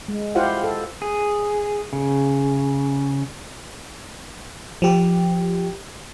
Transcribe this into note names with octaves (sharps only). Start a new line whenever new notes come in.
G#3
E4 F4 G4 C5 F5 F#5
A4
G#4
C#3
F3 G4